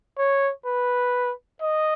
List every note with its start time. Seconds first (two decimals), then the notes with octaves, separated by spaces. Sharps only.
0.18 C#5
0.66 B4
1.62 D#5